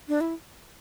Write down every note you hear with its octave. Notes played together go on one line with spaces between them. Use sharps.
D4
E4